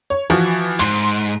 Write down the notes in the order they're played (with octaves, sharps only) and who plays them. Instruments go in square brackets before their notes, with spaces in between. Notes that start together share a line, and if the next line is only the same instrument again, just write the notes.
[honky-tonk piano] C#5
E3 F3 F#4
[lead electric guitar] G#2 [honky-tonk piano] C6